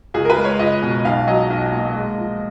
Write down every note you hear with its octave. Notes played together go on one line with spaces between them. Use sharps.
C#2 G#4
A#4
B4
G#3
C#5
C#2 D#5
B2
B1 F5
F#3 D#5
B1
A#2
G#3
F3